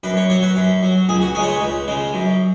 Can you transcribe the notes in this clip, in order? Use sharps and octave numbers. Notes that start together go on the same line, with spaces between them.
F#2 B4
C#5
F#3 C#5
B4
F#2
F#3
C#2 G#4
F#4
C#3 G#3 G#4
C#5
B4
C#2
C#3 G#3
F#2